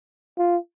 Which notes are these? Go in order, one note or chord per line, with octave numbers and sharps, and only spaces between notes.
F4